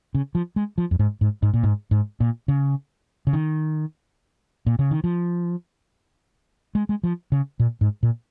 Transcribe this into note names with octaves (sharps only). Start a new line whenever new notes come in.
C#3
F3
G#3
F3
F2
G#2
G#2
G#2
A#2
G#2
G#2
A#2
C#3
C#3
D#3
A#2
C#3
D#3
F3
G#3
G#3
F3
C#3
A#2
G#2
A#2